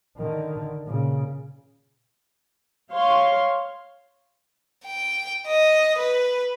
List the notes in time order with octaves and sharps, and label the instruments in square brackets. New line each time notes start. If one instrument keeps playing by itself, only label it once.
[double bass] D3 D#3
A#2 C#3
[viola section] C#5 F5 C6
[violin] G5
D#5
B4